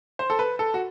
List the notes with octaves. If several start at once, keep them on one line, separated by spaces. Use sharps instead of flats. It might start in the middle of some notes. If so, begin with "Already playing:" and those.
C5
A4
B4
A4
F#4